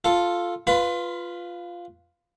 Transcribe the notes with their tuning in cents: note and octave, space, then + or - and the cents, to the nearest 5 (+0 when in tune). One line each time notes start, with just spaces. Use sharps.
F4 +0 A4 +0
F4 +0 B4 +0 B5 +35